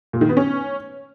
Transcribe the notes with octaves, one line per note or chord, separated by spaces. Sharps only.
A#2
D#3
B3
C#4